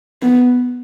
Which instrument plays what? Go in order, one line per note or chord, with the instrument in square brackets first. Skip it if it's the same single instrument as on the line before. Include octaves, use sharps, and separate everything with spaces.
[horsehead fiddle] B3